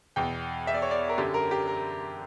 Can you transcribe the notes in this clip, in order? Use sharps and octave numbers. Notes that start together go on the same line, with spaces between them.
E2 B2 G5
E5
D5
C#5
D5
A#4
F#2 D3 G4
A#4
G4
A#4